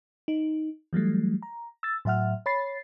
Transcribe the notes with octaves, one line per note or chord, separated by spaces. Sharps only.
D#4
E3 F#3 G3 A3
A#5
E6 A6
A2 F#3 E5 F#5 F6
C#5 B5 A6 C7